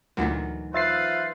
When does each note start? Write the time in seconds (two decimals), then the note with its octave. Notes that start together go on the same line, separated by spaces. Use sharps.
0.17 D2 A#2 D#3 E3 F#3
0.74 F4 B4 C5 E5 A6 C7